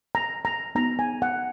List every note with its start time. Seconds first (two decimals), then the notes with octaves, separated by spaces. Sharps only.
0.15 A#5
0.45 A#5
0.75 B3 D#4 F#4 A#5
0.99 G#5
1.22 F#5